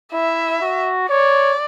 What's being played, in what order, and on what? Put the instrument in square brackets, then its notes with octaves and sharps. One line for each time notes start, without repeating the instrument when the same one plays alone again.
[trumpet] E4 [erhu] E5
[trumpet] F#4
[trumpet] C#5 [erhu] D5